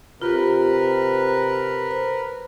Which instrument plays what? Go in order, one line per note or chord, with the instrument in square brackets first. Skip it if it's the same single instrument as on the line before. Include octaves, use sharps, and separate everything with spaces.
[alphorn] C3 [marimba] F4 G4 [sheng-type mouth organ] A#4 B4
[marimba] C5